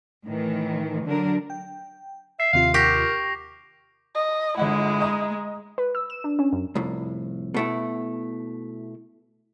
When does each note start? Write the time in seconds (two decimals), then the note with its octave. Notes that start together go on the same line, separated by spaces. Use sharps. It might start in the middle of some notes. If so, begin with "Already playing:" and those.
0.24 A2 D#3 E3
1.05 D3 F#3 D4 A#4
1.50 G5
2.40 E5 C7
2.53 D#2 C3 F4 F5
2.74 G4 A#4 C#6 D6 A#6
4.15 D#5
4.57 G1 G#3 E4 D#5 F#5
5.00 D#5 A#5 D#6
5.78 B4
5.95 E6
6.10 E7
6.24 D4
6.39 C#4
6.53 F#2
6.75 C2 F2 A2
7.54 B2 A3 E4